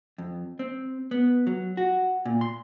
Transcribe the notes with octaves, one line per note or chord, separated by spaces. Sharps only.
F2
C4
B3
F#3
F#4
A#2
C6